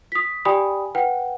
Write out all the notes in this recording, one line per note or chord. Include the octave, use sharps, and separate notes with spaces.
D#6 B6
G4 D5 G5 G#5 B5 D#6
B4 F#5 G5